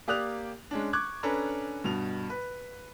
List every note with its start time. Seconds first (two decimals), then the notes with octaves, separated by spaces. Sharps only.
0.08 A#3 G4 D5 D#6 F#6 F7
0.71 G#3 C#4 D4
0.93 C#6 D6 F#6 G#6
1.23 C#4 D4 A4 B4 A#5
1.84 G2 B2 F7
2.30 B4